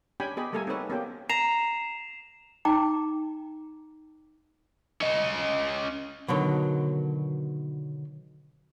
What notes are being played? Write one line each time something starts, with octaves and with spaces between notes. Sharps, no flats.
C#4 D4 G4 G5 G#5 B5
B3 G4 G#4 D#5 B5
G3 A3 A#3 A4 A#4 G#5
C4 D#4 G4 A4 B4 C#5
A#3 B3 C#4 G4 G5
A#5 C7 E7 F7
D#4 G5 A#5 D6
C#4 D#5
B2 D3 D#3 F#3